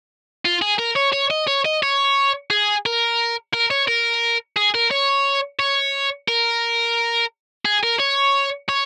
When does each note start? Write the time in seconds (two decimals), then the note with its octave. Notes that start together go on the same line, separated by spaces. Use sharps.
0.45 F4
0.62 G#4
0.79 A#4
0.96 C#5
1.13 C#5
1.31 D#5
1.48 C#5
1.65 D#5
1.83 C#5
2.50 G#4
2.86 A#4
3.53 A#4
3.71 C#5
3.88 A#4
4.57 G#4
4.75 A#4
4.91 C#5
5.59 C#5
6.28 A#4
7.65 G#4
7.83 A#4
8.00 C#5
8.69 C#5